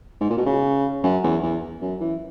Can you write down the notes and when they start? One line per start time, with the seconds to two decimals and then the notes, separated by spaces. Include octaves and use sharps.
0.21 G#2
0.30 A#2
0.37 B2
0.46 C#3
1.04 F#2
1.23 E2
1.43 E2
1.81 F#2
2.00 E3